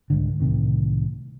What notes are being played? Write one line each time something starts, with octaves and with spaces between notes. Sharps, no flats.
C2 G#2 D3
C2 A2 C3 D#3